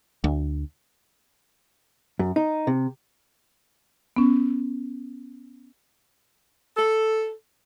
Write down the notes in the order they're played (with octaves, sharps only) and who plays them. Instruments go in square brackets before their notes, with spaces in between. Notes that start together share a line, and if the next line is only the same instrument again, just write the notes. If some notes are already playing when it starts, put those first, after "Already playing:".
[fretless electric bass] D2
[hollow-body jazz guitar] F#2
D#4
C3
[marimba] B3 C#4
[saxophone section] A4